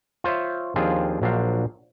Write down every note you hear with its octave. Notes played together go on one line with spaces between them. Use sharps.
F4 C5 C#5 E5
D#2 F3 C4 D4 F4 G#4
A#1 F#3 D4 C5 F5